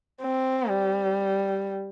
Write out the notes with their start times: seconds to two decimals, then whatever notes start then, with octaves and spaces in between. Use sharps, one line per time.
0.22 C4
0.70 G3